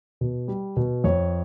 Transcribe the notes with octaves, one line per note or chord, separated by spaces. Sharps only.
B2
G3
B2
F2 C#5